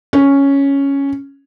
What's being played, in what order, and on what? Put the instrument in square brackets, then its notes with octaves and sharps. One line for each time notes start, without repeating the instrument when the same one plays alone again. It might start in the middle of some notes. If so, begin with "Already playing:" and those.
[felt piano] C#4